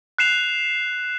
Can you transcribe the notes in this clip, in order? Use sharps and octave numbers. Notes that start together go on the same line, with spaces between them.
F#6 C7 E7 F7